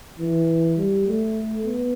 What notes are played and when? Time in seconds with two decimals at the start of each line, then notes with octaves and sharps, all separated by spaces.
0.19 E3
0.77 G3
1.07 A3
1.65 B3